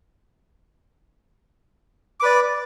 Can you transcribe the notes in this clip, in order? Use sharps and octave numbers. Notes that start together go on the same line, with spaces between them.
B4 D5 D6